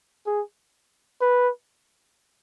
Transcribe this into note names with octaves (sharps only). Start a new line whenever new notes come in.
G#4
B4